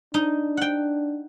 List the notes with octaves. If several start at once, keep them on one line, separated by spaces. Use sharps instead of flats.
D4 D#4
F#5 G5